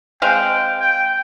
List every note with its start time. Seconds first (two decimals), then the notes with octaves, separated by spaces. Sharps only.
0.22 G#3 C4 F5 G5
0.81 G5